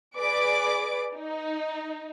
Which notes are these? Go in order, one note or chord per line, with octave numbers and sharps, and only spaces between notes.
G#4 B4 D5 D6
D#4